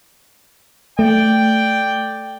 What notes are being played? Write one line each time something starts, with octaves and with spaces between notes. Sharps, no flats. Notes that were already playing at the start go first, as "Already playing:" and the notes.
A3 D5 G5